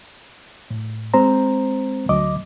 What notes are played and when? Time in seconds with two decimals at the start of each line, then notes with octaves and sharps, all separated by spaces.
0.71 A2
1.14 G#3 C4 C5 A#5
2.09 D2 F#3 D#5 D6